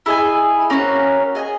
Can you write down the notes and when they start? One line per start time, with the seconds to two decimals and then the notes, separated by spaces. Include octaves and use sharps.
0.06 E4 G#4 D#5 G#5
0.70 A#3 C#4 F#4 C#5
1.35 G#4 D#5 G#5